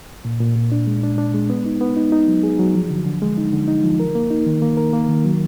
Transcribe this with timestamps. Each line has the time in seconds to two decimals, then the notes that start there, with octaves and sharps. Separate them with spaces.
0.25 A#2
0.41 A#2
0.56 A#2
0.72 D4
0.87 G#3
1.03 D4
1.18 D4
1.34 G#3
1.50 B3
1.66 D#4
1.81 B3
1.97 D#4
2.12 D#4
2.28 F#3
2.43 G#4
2.59 F#3
2.75 F3
2.90 D3
3.06 D3
3.22 G#3
3.37 D#4
3.53 D3
3.68 D#4
3.84 F3
4.00 A#4
4.15 A#3
4.31 D#4
4.46 D#3
4.62 A#3
4.77 A#4
4.93 A#3
5.09 D#3
5.24 F#3